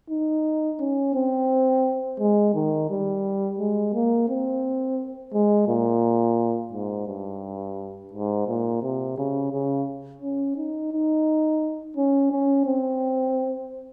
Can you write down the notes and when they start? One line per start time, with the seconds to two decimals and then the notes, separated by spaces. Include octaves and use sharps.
0.10 D#4
0.80 C#4
1.15 C4
2.20 G#3
2.54 D#3
2.90 G3
3.59 G#3
3.94 A#3
4.29 C4
5.33 G#3
5.68 A#2
6.73 G#2
7.08 G2
8.13 G#2
8.48 A#2
8.82 C3
9.18 C#3
9.52 C#3
10.22 C#4
10.57 D#4
10.92 D#4
11.97 C#4
12.32 C#4
12.66 C4